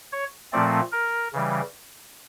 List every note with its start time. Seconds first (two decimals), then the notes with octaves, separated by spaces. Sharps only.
0.12 C#5
0.52 A#2 F3 A3 C4 D5
0.92 A#4
1.33 C#3 E3 G3